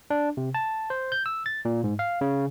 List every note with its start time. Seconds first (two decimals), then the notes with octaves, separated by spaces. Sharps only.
0.10 D4
0.37 C3
0.55 A5
0.90 C5
1.12 G6
1.26 E6
1.46 A6
1.65 A#2
1.84 G#2
1.99 F5
2.21 C#3